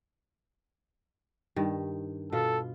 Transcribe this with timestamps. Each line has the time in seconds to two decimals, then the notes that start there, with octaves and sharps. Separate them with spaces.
1.56 G2 D#3
2.32 B2 F4 A4